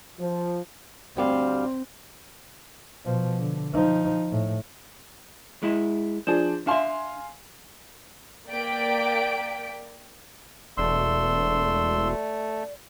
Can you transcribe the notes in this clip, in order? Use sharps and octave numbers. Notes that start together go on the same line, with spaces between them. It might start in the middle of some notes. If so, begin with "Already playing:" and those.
F3
D2 G3 C4 F5
B2 F3
D3
F3 D#4
A2
G#3 E4
F3 D4 G#4 C5
D4 E5 F5 G#5 C6
A#3 D5 G5 B6 D7
E1 A3 D5 C6 E6